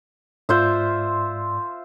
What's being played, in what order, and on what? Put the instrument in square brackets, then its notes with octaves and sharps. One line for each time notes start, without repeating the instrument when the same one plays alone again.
[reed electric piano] G#2 D5 G6 [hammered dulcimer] F4 C5 E5